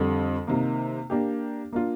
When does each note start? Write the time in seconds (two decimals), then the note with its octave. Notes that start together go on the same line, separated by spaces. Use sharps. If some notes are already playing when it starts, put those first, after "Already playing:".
Already playing: F2 D3 G3
0.47 C3 D#3 A#3
1.10 A#3 D4 G4
1.72 A#3 D4 F4